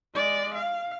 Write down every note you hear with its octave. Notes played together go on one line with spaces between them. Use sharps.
G#3 D5
F5